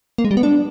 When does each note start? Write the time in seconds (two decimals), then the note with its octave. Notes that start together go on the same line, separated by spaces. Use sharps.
0.18 A#3
0.25 G#3
0.31 G3
0.37 B3
0.43 D4